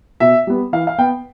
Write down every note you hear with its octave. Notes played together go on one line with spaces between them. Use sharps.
B2 E5
G3 B3
E3 F5
F5
B3 G5